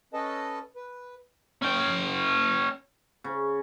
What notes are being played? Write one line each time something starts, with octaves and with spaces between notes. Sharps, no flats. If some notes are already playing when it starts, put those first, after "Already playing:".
C#4 A4 B4 D#5 A5
B4
C#4 G5
C#3